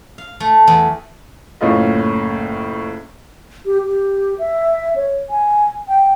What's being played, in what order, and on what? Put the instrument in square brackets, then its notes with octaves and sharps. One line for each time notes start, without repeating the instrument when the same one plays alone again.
[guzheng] F5
A3
E2
[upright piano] F#1 A2 C#4 F4 D#5
[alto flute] G4
G4
E5
C#5
G#5
G5